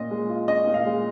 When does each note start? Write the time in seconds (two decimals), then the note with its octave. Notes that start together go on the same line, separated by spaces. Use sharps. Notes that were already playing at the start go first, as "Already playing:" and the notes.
Already playing: A#2 C#4 D#5
0.11 G#3
0.29 F4
0.48 C#4 D#5
0.67 A#2
0.74 F5
0.85 G#3